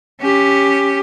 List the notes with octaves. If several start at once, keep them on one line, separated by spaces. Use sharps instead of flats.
C#4 G4